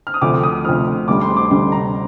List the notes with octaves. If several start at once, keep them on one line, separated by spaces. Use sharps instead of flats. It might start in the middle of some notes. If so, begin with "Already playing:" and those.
F6
D#6
D2 D3 F3 C4 D6
D#6
D2 D3 F3 C4 F6
D2 D3 G3 D6
C6
D6
D2 D3 G3 C6
A#5